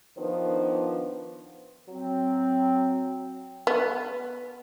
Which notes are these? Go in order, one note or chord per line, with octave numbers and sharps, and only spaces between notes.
D#3 F3 B3 D4 B4 C5
F#3 C4
B3